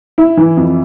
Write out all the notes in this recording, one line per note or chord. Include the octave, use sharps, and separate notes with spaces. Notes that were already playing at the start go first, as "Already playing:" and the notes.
E4
E3
F2